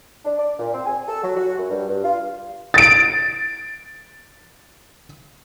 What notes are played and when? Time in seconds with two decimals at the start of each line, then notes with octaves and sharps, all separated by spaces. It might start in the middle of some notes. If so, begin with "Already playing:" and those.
0.24 D4
0.38 D5
0.58 A#2
0.73 C4
0.86 G#5
1.07 A4
1.23 F#3
1.36 F#4
1.57 F#2
1.69 G2
1.87 G2
2.04 F4
2.74 A6 D7